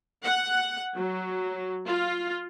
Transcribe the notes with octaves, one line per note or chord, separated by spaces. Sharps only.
F#5
F#3
F4